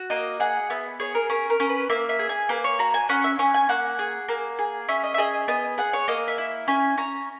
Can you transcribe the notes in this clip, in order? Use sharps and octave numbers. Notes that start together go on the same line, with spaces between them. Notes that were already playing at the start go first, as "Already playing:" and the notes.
Already playing: F#4
A#3 D#5
G#4 F#5
B3 E5
G#4 C#5
A#4
C#4 A#4
A#4
C#4
B4
A#3 E5
E5
G#4
G#5
A#3 B4
C#5
F#4 A#5
G#5
C#4 F#5
E5
C#4 G#5
G#5
A#3 F#5
G#4
A#3
G#4
C#4 E5
D#5
E5
G#4 D#5
B3 D#5
G#4 F#5
C#5
A#3 D#5
E5
E4
C#4 G#5
C#4 A#5